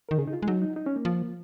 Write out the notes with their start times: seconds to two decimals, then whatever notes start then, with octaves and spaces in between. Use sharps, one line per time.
0.09 D#3 A#4
0.18 C#3 G#4
0.27 D#4
0.33 F4
0.42 G#3
0.48 F#3 D#4
0.62 D#4
0.76 D#4
0.86 C#4
0.96 A#3
1.05 F3